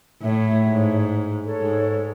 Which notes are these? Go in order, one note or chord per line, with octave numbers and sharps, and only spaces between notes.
A2 C#5 E5
G#2
A4 C#5
G#2